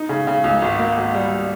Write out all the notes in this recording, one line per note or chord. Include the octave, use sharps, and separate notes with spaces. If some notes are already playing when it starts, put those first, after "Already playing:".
Already playing: D#4
C#3
C#3
C#2
G#1
A#3
G#1
G3